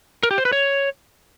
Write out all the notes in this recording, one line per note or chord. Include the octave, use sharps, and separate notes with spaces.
A#4
G4
C5
B4
C#5